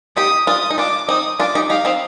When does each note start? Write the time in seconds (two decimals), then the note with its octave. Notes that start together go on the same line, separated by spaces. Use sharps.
0.17 D#4 G4 D#6
0.47 D4 F4 D#6
0.70 D#4
0.78 D4 F4 D6
1.09 C4 D#4 D#6
1.39 D4 F4 D6
1.55 D#4 G4
1.70 D#4 G4 F5
1.85 C4 D#4